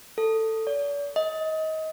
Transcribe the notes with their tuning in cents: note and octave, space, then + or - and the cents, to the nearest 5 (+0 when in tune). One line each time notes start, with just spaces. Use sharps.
A4 +15
D5 -45
D#5 +25